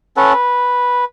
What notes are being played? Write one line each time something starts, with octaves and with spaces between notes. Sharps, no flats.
C#4 A4 B4 F#5
B4